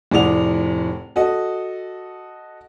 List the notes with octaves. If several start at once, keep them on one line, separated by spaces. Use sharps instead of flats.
F1 A2 G#4 D5 F#5 F7
F#4 A4 D#5